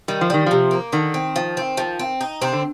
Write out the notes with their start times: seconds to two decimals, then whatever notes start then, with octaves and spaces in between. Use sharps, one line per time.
0.08 D#3 G3
0.21 F3
0.30 D#3 G3
0.46 C3 F3
0.71 A#3
0.93 D3 D#3
1.14 C4
1.36 F3
1.57 C4
1.77 F3
1.99 C4
2.21 D#4
2.42 C3 C4
2.53 D3